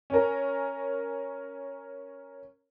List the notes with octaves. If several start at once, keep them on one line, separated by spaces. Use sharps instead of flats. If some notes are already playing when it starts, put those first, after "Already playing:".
C#4 A#4